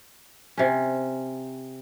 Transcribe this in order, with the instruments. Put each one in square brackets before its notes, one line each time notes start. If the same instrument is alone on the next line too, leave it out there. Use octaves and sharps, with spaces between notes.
[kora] C3 C#4